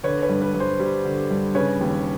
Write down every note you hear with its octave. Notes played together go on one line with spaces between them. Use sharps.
D3 B4 C#5
B4 C#5
G2
B4
G2
C5
G3
D3
G2
C#3 B4 C#5
D#2